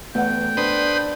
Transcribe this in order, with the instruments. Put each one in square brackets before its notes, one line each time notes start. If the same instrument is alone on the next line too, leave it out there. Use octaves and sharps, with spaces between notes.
[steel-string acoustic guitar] E2 A3 [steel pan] B3 F#5 [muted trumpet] G5
[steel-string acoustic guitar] D4 [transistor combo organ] B4 C5 D#6